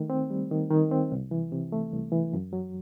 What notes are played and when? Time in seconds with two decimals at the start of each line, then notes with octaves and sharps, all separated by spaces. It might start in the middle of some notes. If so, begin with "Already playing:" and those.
Already playing: D#3 A3
0.10 C4
0.30 G3
0.51 D#3
0.71 D#3
0.91 C4
1.12 C2
1.31 E3
1.52 C3
1.72 A3
1.92 C2
2.12 E3
2.33 F#2
2.53 F#3